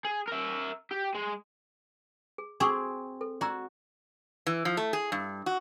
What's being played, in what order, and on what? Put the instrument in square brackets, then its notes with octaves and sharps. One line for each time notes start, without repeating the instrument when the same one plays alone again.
[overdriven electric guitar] G#4
A#4 E5
G4
G#3
[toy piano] G#4
[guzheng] C4 G#4 [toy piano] F#4 C#6 D6
[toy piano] A4
[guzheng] F#4 [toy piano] D5 A#5 E6
[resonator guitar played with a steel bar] E3
F3
A3
G#4
G2
F#4